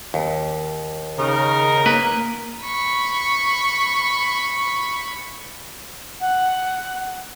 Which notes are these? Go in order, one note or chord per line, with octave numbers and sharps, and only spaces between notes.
D#2
C#3 D#4 A#4
A#3 B4 A#5
B5 C#6
F#5